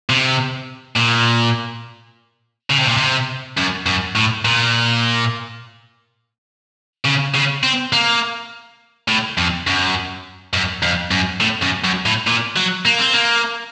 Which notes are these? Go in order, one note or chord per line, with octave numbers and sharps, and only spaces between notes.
C3
A#2
C#3
C3
A#2
C3
F#2
F#2
A2
A#2
C#3
C#3
C4
A#3
A2
F2
F#2
F#2
F2
F#2
A2
F#2
F#2
A2
A#2
F#3
A#3
C4
A#3